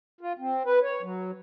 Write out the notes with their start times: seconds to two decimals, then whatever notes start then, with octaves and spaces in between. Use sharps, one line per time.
0.21 F4
0.39 C4
0.66 B4
0.83 C#5
1.03 F#3